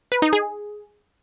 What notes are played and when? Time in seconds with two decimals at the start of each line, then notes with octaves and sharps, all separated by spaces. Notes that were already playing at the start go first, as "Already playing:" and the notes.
0.12 B4
0.22 D#4
0.33 G#4